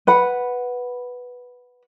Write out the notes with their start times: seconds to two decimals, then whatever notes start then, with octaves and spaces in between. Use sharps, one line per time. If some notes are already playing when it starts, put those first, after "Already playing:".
0.07 B4 F#5 B5